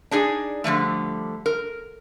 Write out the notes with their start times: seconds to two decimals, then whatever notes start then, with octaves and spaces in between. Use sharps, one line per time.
0.11 D4 D#4 G#4 D5
0.64 D3 F3 G3 A3
1.46 A#4